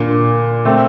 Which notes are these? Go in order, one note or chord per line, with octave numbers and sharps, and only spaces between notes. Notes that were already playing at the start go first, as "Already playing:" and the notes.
Already playing: A#2 D3
A3 C4